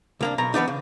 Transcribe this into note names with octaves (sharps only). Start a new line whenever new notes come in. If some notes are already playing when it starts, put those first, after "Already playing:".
C2 A#3 D4
B1 B2 A#5
E3 B3 D4 D#4
C#3